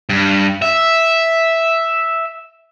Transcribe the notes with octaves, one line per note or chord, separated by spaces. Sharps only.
G2
E5